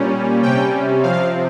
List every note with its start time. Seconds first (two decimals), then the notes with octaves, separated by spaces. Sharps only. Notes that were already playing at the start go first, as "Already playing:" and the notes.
Already playing: A#2 G3 C#4
0.43 C3 G3 C#4 G5
1.03 C3 F3 C4 F5